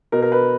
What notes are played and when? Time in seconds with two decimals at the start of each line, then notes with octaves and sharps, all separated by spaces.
0.12 B2 A#4
0.22 A#4
0.32 B4